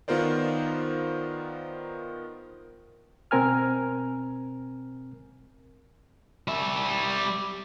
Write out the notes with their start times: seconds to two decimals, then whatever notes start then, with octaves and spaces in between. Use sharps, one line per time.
0.08 D#3 B3 F4 A#4 C5 D5
3.31 B2 C4 A#4 G#5 F6
6.48 G3 E5